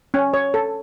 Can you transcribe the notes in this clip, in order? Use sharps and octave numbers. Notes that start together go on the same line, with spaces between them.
C#4
C#5
A4